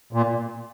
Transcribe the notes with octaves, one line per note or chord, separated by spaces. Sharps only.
A#2